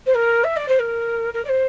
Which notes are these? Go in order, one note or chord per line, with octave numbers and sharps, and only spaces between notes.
C5
A#4
E5
D5
C5
A#4
A#4
D5
C5